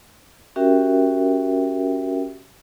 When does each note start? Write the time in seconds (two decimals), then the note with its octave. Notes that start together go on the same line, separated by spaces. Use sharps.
0.56 C#4 F#4 G4 A#4 E5 G5